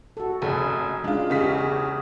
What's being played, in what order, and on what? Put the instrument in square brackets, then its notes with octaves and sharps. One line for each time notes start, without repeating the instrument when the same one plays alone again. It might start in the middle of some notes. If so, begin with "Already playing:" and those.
[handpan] F#4 A4
[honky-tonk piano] F1 C#2 [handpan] G#4
[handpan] G#3 C#4 [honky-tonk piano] D4 F4
[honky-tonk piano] E2 C#3 B6 [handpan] G4
[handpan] G#4